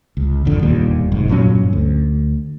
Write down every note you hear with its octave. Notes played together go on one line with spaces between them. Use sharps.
C#2
G#1 F2 D3
E1 D#2 A#2 G3
F1 G#2
G2 A#2 F#3 C#4
D2